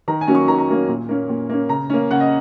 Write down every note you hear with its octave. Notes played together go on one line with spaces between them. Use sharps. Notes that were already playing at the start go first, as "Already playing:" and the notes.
D#3 A#5
G#5
F#3 A#3 C#4
C#6
D#3 A#5
C#6
A#5
F#3 A#3 C#4
A#2
A#3 C#4
A#2
A#3 C#4
C#3 A#5
A#3 C#4
C#3 F#5
D#5